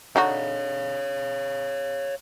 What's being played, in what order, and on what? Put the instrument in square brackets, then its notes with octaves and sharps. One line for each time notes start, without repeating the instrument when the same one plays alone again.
[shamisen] D3 D#4 F#4 [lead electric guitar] C#5 F5